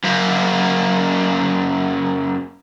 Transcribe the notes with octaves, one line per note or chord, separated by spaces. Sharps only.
F#2 A#3